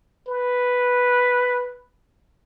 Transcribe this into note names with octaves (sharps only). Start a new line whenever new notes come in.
B4